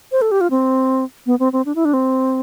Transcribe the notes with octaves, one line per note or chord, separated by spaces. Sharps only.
C5
A4
G4
F4
C4
B3
C4
C4
D4
E4
D4
C4